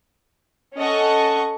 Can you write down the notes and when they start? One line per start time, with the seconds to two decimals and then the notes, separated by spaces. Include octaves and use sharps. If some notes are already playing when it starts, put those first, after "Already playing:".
0.77 C#4 A4 D#5 F#5 C#6